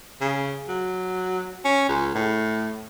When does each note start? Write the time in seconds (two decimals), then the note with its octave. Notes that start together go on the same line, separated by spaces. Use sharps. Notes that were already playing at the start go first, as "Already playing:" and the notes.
0.21 C#3
0.68 F#3
1.65 C#4
1.89 C#2
2.15 A2